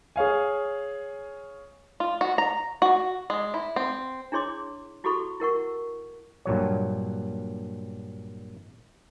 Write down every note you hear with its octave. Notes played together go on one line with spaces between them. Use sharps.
G#4 C#5 F5 G#5
F4
F#4
A#5
F#4
G#3
E4
C4
D4 E4 G#4 C#5 C6 D6
E4 F#4 G4 A4 B5 C#6
E4 A#4 F#5 C#6
G2 A#2 F#3 C#5